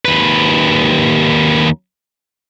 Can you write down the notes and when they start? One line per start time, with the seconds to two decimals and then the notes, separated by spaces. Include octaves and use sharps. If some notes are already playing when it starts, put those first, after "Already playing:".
0.05 D#2 B4